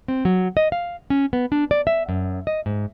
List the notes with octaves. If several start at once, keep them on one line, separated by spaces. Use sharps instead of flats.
C4
F#3
D#5
F5
C#4
B3
D4
D5
E5
F#2
D#5
G#2